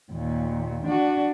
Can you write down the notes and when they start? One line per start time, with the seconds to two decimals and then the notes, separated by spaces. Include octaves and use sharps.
0.12 D#2 A#2
0.85 D4 F#4